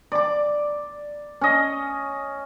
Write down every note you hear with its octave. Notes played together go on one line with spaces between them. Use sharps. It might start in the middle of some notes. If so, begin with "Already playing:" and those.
D5 D6
C#4 D#5